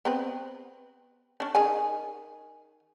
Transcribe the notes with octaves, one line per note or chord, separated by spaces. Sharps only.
B3 C4 B4
C#4 D4
D#3 G#4 G#5